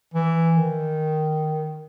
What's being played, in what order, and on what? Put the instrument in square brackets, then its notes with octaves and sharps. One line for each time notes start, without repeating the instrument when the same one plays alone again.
[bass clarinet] E3
D#3